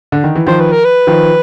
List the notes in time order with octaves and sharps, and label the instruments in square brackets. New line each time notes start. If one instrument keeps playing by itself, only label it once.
[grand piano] D3
D#3
E3
[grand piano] D#3 F3 [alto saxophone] C5
[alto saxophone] B4
A#4
B4
[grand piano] D#3 F3